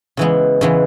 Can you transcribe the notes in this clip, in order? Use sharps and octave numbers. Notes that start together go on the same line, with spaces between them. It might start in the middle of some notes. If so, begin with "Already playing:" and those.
C#3 E3 G#3 B3
C#3 E3 G#3 B3